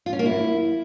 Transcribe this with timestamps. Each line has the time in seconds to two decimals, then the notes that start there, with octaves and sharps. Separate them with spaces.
0.06 F4
0.13 C#4
0.19 A#3
0.26 E4